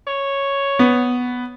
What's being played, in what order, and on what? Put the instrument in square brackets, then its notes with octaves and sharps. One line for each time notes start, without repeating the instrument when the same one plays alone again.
[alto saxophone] C#5
[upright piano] B3